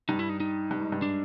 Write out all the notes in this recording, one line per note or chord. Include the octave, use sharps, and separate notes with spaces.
G2 D#4
E4
D#4
D#4
G2
G#2
G2
D4